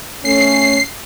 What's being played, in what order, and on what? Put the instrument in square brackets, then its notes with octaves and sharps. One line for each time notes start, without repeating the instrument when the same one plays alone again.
[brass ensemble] A3 C#4 [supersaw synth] C7